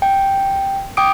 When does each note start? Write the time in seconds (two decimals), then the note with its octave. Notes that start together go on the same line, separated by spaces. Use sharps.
0.02 G5
0.97 G5 D6 D#6 D7